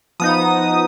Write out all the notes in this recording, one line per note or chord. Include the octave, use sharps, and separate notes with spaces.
F3 B3 D#4 D#6